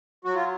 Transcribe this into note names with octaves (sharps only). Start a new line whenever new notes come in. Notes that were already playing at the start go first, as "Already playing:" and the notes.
F#3 F#4
F4